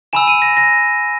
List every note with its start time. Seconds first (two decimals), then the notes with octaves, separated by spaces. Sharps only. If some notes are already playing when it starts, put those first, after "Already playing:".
0.13 G#5 B5 E6 E7
0.27 D#7
0.42 A#6
0.57 A#6